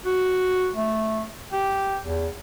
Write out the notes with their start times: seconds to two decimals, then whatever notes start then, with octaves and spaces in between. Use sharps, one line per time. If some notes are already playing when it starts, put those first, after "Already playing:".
0.05 F#4
0.75 A3
1.53 G4
2.02 E2